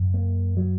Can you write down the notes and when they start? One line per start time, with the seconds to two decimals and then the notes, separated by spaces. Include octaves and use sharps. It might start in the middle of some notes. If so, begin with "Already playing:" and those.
Already playing: F#2 C#3
0.14 A#3
0.57 F#3